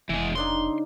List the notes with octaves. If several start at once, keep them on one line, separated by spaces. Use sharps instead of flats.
F1 E3 G#3
C#3 D4 D#4 C6